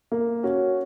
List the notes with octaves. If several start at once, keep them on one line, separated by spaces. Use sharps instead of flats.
A#3
C#4 F#4